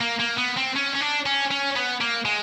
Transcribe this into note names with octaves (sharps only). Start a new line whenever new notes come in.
A#3
A#3
B3
C4
C#4
C#4
D4
C#4
C#4
B3
A#3
G#3